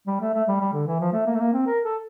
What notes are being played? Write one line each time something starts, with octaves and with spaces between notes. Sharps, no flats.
G3
A3
A3
G3
G3
D3
E3
F3
A3
A#3
A3
A#3
C4
A#4
A4